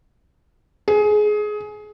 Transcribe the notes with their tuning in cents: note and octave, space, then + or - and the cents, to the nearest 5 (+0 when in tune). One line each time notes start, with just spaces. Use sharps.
G#4 +20